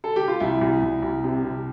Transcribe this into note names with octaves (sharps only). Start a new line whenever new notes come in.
A4
G4
F4
C2 E4
C2
C2
C2
C3
C3